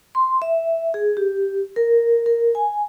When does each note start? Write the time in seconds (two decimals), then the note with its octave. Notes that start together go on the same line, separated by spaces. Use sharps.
0.15 C6
0.42 E5
0.94 G#4
1.17 G4
1.76 A#4
2.26 A#4
2.55 G#5